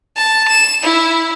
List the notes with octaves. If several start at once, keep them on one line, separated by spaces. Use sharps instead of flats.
A5
E7
E4